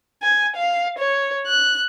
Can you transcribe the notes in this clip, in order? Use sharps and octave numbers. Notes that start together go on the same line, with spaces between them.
G#5
F5
C#5
F#6